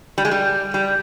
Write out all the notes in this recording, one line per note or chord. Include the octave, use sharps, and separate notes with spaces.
G3
G#3
G3
G3